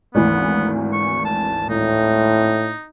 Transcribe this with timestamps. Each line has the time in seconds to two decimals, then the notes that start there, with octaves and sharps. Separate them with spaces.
0.15 G#1 D2 E3 B3
0.93 C#6
1.25 A5
1.70 A2 D#4